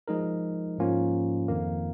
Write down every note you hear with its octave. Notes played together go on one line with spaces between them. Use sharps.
F3 G#3 D#4 A#4
G#2 F3 A#3 C#4 F4
F2 D#3 A#3